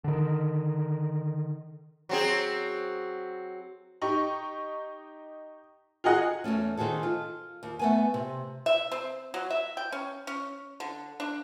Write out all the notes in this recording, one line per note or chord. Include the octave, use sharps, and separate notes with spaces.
D3 D#3
F#3 C4 G#4
D#4 G4 C#6
F4 F#4 G#4 D#5 F#5
E2 G2 A3 C#4
D#3 C4 F#4 G#4 A4
F4
D#2
A3 B3 G#5
C3
E5
C4
F#3
E5
G5
C#4
C#4
D3
D4